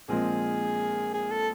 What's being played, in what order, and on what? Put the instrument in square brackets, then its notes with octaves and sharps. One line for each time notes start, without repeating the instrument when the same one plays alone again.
[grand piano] A#1 A#2 F3 G#3 C4 [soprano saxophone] G#4
[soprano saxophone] G#4
A4